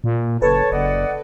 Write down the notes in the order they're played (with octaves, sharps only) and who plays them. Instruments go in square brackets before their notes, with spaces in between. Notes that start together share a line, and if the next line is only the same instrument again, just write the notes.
[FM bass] A#2
[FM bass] F#1 [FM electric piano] A4 B4 [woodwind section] C#5 A5
[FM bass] F#1 [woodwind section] D5 D#5 F#5